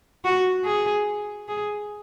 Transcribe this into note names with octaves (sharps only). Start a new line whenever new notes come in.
F#4
G#4
G#4